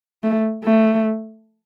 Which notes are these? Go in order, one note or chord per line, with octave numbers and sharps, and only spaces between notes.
A3
A3